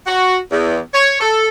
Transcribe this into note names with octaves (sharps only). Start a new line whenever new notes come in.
F#4
E2
C#5
A4